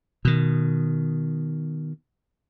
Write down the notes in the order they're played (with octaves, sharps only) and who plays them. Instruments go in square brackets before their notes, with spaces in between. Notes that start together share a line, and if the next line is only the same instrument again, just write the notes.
[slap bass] B2 D#3